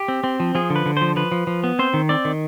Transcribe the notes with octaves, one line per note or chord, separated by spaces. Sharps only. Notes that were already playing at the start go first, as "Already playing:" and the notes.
Already playing: G4
C4
C4
F3
F3 G#4
D3
B4
D3
F3 C5
F3 B4
F3
F3
B3
C4 C5
D#3
C4 D5
D#3